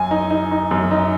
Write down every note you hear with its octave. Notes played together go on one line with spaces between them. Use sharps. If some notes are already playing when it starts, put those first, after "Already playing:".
Already playing: F#2 G#5
D#4
D#4
D#4
F#2
D#4